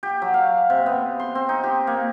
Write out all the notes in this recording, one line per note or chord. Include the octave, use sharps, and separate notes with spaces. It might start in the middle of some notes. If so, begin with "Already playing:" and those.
G4
F#3
F5
C3
B3
C6
C4
D#4
G4
A#3